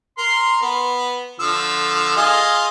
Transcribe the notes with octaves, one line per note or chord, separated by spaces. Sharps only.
A#4 C6
B3
D3 F3 E6
F4 G#4 D#5